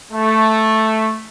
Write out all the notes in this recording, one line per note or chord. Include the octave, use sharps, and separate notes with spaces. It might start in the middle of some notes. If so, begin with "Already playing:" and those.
A3